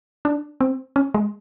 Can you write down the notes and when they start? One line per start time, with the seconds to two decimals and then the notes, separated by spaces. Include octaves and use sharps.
0.25 D4
0.61 C4
0.96 C#4
1.14 G#3